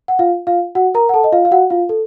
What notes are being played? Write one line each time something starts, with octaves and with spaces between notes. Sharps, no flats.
F#5
F4 F5
F4 F5
F#4 F#5
A#4 A#5
F#5
A4 A5
D#5
F4 F5
F5
F#4 F#5
F4 F5
A4